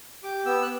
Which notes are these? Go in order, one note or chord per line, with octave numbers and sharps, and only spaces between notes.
G4 D6
B3 E6
F#6